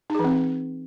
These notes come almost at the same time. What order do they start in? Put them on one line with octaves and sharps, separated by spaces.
D#4 G#4 E3 C4